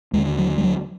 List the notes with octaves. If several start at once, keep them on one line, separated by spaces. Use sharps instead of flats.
D#2 D3 G#3
F#3
G3
F#3